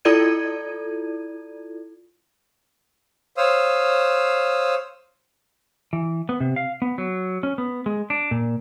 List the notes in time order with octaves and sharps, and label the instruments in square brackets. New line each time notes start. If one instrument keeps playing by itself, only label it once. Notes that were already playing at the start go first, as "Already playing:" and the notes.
[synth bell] E4 F4 A4 D5 G#6 D#7
[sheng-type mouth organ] C5 C#5 F5 D#6 E6
[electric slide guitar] E3
B3
C3
F5
B3
F#3
C#4
B3
G#3
D4
A#2